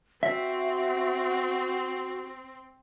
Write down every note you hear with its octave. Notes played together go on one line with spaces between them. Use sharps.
C4 F#4 E5